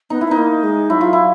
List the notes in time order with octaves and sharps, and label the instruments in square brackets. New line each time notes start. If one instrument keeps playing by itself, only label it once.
[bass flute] B3 [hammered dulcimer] D#4
[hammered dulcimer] E4
[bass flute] B3 [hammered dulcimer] D#4
[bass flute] A#3
G#3
[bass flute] F#3 [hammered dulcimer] E4
[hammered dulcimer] F4
E4